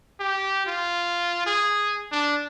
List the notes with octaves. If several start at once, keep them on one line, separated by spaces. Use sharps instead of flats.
G4
F4
G#4
D4